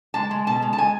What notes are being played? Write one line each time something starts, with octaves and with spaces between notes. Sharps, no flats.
G#3 A5
G#3
B2 A5
G#3
A5
G#3 G#5